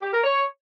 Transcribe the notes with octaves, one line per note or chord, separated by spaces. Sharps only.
G4
A#4
C#5